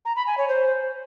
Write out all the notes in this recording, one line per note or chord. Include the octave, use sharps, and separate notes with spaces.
A#5
B5
G#5
C#5
C5